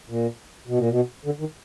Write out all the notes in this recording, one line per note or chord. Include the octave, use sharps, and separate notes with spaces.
A#2
B2
A#2
B2
D3
D#3